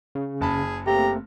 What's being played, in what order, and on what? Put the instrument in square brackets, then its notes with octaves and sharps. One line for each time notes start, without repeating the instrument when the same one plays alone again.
[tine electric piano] C#3
[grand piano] F#1 A5 B5 [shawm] G#4
[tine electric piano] A3 A#3 C4 [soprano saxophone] G4 [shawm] A#5